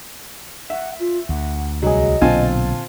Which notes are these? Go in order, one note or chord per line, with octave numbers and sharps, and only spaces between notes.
E5 F#5
F4
D2 F#5
C2 F#3 G#4 D#5
B1 A#2 D3 C4 F4 G#5 A5